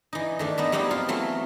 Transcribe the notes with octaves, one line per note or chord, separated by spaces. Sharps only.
E3 D#4
D#3 A3 D4
B3 D#4 E5
F#3 G3 B3 C4 D#4 E4
F4
E3 F#3 A3 F4 E5